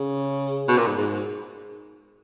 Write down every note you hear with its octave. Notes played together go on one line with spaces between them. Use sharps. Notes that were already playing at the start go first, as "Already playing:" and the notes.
Already playing: C#3
B2
A#2
G#2
G#2